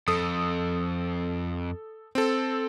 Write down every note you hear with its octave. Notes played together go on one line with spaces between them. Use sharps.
F2 A4 D#6
C4 A4